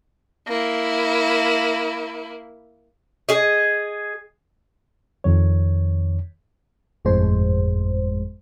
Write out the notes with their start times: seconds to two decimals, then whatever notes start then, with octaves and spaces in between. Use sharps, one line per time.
0.48 A#3 E4
3.29 G#4 D#5
5.24 F2 D#3 C#5
7.05 G1 F2 A2 G#3 C5